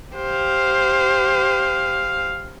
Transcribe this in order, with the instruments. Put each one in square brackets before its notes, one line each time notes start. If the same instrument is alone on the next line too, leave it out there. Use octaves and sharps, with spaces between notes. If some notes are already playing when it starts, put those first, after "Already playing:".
[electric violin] G4 C5 [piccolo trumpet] F5